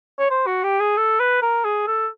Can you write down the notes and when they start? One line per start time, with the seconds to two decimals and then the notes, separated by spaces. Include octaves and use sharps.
0.19 C#5
0.31 C5
0.47 F#4
0.64 G4
0.80 G#4
0.97 A4
1.20 B4
1.42 A#4
1.65 G#4
1.87 A4